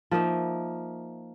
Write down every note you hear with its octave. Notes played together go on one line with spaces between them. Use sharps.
F3 A#3 D#4 E5